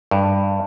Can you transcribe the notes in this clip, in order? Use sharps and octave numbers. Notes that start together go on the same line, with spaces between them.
G2